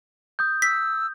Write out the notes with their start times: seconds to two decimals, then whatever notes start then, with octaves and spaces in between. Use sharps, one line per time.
0.39 D#6 G6
0.62 E6 B6